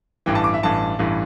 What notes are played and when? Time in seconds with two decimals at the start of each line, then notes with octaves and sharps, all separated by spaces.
0.26 A1 G2 E3 G5
0.35 A5
0.44 D6
0.54 E5
0.63 A1 G2 E3 A5
0.99 A1 G2 E3